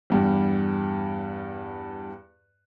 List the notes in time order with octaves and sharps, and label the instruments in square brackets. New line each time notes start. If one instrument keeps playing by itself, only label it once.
[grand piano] E2 G2 G3